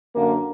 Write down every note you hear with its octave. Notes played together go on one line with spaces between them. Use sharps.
F#2 D3 A#3